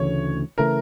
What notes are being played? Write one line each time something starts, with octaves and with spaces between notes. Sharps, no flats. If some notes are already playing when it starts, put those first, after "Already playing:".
Already playing: D2 C#3 E3 A3 C#5
C#3 E3 A3 A#4